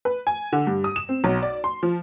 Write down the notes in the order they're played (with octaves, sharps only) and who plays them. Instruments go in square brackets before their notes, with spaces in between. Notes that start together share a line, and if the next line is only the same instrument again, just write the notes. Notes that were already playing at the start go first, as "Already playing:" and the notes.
[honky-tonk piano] B4
G#5
D3
G2
D#6
E7
C4
B1
D5
C6
F3